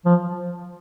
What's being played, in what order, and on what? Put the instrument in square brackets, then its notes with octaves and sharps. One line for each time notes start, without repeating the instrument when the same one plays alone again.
[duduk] F3